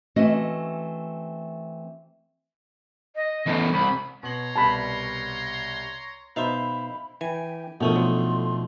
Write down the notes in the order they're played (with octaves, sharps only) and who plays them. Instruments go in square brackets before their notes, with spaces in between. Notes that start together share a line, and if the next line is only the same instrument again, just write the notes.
[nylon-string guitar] E3 A3 C4 C#4 F#4 D#5
[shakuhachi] D#5
[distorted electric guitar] E2 A2
[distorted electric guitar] C2 [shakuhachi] B5
[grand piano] B2 F#7 [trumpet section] C#5 A#5 C6
[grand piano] C2 B2 G3 [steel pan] A5 B5
[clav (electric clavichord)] B2 D#4 [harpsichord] C5 E5 F5 [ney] B5
[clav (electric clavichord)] E3 [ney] G5 [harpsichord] G#5
[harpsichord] F2 A3 D#6 [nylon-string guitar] B2 D4 D#4 [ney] A#4
[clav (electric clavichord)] F#3 [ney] C6